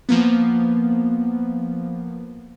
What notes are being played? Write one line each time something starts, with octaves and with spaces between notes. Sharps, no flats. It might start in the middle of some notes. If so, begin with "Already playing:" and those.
F3 A#3 B3